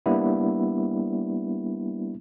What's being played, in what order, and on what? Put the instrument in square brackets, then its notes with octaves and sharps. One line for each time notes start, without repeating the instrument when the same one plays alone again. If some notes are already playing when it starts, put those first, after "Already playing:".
[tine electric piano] G3 A#3 B3 D4 E4